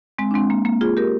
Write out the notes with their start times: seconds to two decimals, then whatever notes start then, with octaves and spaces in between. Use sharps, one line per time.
0.19 G#3 C4
0.31 D4
0.34 G#3 C4
0.50 A#3
0.65 A#3
0.81 F4 G#4
0.97 G4 A#4